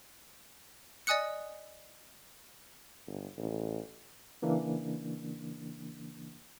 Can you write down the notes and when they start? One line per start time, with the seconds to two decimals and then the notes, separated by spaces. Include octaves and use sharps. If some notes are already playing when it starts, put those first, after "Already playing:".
1.07 D5 D#5 G#5 D#6 F#6 C#7
3.07 G1
3.38 A1
4.42 C#3 E3 A#3 D4